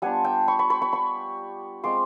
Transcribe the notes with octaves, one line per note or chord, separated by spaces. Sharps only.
G3 B3 D4 F4 F#5 G#5
G5 A5
B5 C#6
B5 C#6
B5 C#6
B5 C#6
B5 C#6
G#3 C4 F4 C6 D6